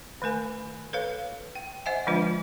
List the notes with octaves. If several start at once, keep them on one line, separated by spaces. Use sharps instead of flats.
D#3 A3 A#4 G#5
A4 B4 C#5 F5
G5
C5 D#5 E5 F#5 G#5
D3 F3 G#3 D4 F4 B4